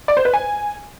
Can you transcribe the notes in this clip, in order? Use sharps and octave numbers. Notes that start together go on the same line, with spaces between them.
D5
C5
B4
G#5